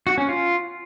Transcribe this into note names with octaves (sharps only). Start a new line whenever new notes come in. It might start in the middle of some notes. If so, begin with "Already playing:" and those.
F#4
C#4
F4